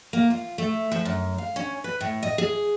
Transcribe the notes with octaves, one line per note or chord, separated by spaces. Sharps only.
A#3
F4
A3
F3
F#2
F5
C#4
B4
A2
D#5
G#4